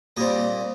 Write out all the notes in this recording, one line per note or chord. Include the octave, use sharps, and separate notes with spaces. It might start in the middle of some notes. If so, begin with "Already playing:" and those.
A#2 G3 C4 D#5